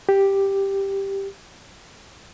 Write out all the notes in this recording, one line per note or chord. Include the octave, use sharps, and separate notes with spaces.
G4